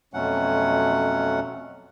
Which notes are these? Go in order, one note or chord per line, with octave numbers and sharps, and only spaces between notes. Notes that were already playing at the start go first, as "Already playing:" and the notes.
F2 B2 F#3 A3 C#4 F#5